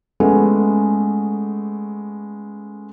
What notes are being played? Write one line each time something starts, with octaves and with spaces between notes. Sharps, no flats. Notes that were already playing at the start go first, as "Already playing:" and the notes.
G#3 A3 B3 C#4